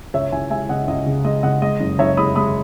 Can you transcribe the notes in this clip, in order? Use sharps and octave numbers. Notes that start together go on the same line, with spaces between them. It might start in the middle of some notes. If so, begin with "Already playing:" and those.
C#2 C#5 E5
C#2 E5 G#5
G#3 E5 G#5
C#3 D#5 F#5
C#2 D#5
C#3
G#3 D#5
C#3 D#5 F#5
G#3 D#5
F#1
F#1 C#5 E5
G#3 B5 D#6
G#3 B5 D#6